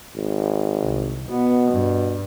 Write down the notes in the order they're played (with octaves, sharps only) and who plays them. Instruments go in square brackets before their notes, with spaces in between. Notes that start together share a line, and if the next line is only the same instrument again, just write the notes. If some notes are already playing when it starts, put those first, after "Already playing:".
[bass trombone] G#1
[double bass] C2
[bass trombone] B2 [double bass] B3
[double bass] G2